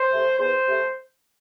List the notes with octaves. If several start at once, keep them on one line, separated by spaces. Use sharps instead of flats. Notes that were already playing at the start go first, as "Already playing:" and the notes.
Already playing: C5
C3 A3
E2 C5
C3 A3